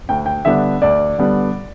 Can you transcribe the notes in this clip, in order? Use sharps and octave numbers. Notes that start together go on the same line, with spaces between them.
D2 G5
G5
D3 G3 B3 D4 E5
D2 D5
D3 G3 B3 D4